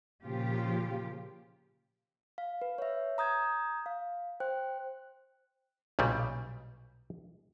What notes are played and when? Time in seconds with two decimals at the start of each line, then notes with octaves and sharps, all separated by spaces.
0.24 A#2 C#3 F3 F4 G4
2.38 F5
2.62 B4
2.78 C#5 E5
3.18 A#5 D#6 G6 G#6
3.86 F5
4.40 C5 G5 F#6
5.99 B1 A#2 C#3 G3